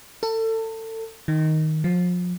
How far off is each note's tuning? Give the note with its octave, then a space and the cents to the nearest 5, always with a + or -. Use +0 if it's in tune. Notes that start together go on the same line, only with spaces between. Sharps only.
A4 +30
D#3 +5
F3 +35